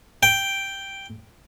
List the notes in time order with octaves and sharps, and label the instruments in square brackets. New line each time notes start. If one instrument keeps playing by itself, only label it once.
[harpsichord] G5